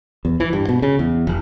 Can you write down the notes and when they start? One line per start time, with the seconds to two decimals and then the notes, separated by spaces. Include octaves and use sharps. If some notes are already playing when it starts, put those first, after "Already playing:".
0.25 E2
0.40 E3
0.53 G2
0.69 B2
0.82 C#3
0.99 E2
1.27 F1